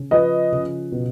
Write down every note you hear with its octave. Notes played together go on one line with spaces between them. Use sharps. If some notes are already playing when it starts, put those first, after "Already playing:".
Already playing: C#3
F3 B4 D#5
C#3
B2